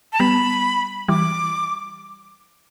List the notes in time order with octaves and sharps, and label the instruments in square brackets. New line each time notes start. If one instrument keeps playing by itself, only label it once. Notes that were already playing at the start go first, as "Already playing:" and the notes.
[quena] A5
[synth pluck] G3 B3 [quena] B5
[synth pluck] E3 G3 [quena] D6